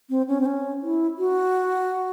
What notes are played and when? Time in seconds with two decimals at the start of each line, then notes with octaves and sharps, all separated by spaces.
0.10 C4
0.28 C#4
0.40 C4
0.46 C#4
0.82 E4
1.18 F#4